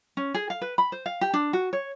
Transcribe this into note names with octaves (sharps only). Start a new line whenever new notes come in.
C#4
G#4
F5
B4
B5
C5
F5
G4
D4
F#4
C#5